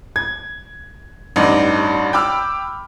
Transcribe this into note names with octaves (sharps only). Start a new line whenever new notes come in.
G#6
A1 G2 D#4 D5
G5 B5 D6 E6 F6